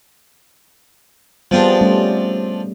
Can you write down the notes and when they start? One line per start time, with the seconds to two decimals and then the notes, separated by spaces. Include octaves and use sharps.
1.51 F3 G3 B3 C4 D4 G#4
1.81 G3 A3 C#4